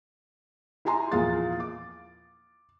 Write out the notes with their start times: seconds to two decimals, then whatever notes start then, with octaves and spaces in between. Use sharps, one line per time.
0.85 E4 G4 G#5 A#5 C6
1.12 E2 A#2 F3 F4 G#4 A6
1.60 D6